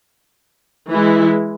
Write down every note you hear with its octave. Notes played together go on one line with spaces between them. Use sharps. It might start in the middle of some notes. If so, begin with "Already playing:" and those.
E3 G#3 E4